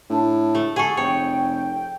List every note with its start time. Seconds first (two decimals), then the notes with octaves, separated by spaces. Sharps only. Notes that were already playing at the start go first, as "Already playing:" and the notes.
0.10 A2 D4 A5
0.55 A3
0.76 G#4 A4 F#5 C#6
0.97 F1 C#5 G5